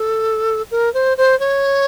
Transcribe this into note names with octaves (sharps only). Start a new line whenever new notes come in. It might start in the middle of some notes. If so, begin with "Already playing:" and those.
Already playing: A4
A#4
C5
C5
C#5